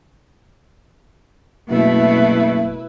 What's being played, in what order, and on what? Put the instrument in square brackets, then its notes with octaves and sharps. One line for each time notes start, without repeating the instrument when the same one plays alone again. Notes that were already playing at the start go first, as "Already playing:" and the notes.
[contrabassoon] F#1 [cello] B2 A3 [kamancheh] E4 B4 [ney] E5